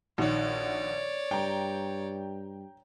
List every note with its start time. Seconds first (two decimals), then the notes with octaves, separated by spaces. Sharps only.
0.18 A#1 D#3 F#4 C#5 D5
1.31 G2 G5 A#5